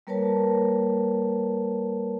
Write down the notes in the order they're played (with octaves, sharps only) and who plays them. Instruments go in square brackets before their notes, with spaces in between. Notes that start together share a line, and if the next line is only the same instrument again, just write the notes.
[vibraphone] G3 A#3 A#4 B4 C#5 A5